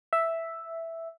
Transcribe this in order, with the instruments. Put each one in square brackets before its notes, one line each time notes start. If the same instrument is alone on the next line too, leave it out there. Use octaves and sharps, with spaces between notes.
[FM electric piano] E5